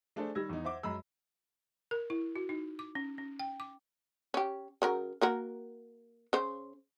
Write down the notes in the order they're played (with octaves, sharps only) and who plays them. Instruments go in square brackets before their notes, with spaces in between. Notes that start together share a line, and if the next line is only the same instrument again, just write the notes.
[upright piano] A3 D4 G#4 A4 C5
D#3 G3 E6 G#6 A#6
E2 D#4
C5 E5 F#5 D6
F#2 G#3 A#5 B5 E6
[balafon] A#4
E4
F#4
D#4
D6
C#4
C#4
G5
D6
[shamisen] C#4 G4
C#3 F#3 A#4
A#3 F#4 A#4
C#3 C5